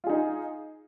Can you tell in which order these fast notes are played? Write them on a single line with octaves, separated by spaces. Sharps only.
F4 G#4 D#4